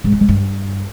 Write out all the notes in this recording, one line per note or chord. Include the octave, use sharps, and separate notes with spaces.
G#2
C3
G#2
G2